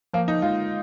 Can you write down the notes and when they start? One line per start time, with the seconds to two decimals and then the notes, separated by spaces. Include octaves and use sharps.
0.13 F3 A#3
0.28 D#4
0.42 G#3 F4